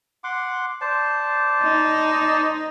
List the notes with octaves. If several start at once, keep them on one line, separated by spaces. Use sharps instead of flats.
F#5 C6 D6
C5 D5 A5
D#4